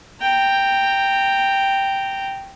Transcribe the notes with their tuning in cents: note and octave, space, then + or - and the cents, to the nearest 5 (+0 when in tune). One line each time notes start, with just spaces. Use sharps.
G5 +0 A#5 -20